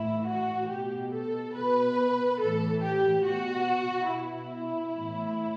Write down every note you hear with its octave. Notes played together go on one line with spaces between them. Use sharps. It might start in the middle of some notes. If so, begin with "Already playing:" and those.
Already playing: A2 E3 E4
F#4
B2 G4
A4
B2 B4
A2 E3 A4
G4
B2 F#4
B2 E4
A2 E3